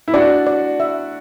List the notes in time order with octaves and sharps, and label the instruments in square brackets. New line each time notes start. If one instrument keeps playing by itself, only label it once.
[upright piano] E4
[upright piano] D4 F#4 [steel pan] D5
[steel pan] D5
E5